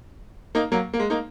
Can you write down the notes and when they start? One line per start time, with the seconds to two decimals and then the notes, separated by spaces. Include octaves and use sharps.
0.55 A#3 D#4
0.72 F#3 A#3
0.94 A#3
0.99 G#3
1.10 A#3 D#4